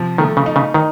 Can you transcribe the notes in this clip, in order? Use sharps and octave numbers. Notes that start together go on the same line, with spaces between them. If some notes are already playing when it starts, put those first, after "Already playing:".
Already playing: C3 F3
D#3 A3
C#3
D#4
C#3
D#3 D#4